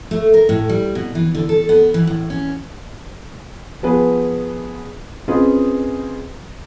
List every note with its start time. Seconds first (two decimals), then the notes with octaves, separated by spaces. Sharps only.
0.11 A3
0.34 A#4
0.49 A2
0.69 G3
0.95 B2
1.15 E3
1.35 D3
1.49 A4
1.69 B3
1.94 E3
2.07 A2
2.30 C#4
3.83 F3 B3 G#4 B4
5.28 C4 C#4 F4 G#4 B4 D#5